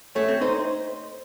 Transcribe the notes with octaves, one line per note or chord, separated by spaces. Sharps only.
A3 C#5
C4
D#4 C5